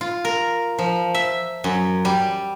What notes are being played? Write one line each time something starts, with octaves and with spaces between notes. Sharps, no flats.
F4
A#4
F3
E5
F#2
G3